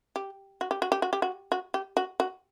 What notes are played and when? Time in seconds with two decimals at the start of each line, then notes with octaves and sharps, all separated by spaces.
0.16 G4
0.61 F#4
0.71 G4
0.82 F#4
0.92 G4
1.02 F#4
1.13 G4
1.22 F#4
1.52 F#4
1.74 G4
1.97 F#4
2.20 F#4